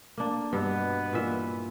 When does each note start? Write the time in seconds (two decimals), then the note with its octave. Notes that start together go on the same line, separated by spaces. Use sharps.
0.18 A#3 D4
0.53 G2 B2 B3 B4
1.13 A#2 E3 E5